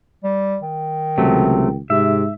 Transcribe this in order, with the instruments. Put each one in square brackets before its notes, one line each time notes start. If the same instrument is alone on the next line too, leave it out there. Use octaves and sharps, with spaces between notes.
[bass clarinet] G3
D#3
[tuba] C#2 [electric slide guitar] C3 F#3 A3
[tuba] G#2 [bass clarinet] C3 [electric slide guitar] E5